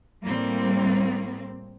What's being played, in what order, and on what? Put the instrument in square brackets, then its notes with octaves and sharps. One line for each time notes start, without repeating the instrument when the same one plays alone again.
[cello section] A2 G3 A#3 C4